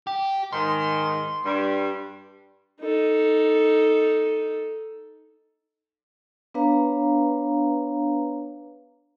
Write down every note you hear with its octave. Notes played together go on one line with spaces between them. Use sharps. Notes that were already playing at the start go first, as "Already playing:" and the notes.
G4
G#2 D#3 C6
G2 G3
D#4 A4
B3 D4 B4 C#5 F5 A#5